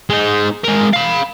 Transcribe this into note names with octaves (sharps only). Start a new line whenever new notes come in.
G#3 D#4
G#3 A#4
F5 B5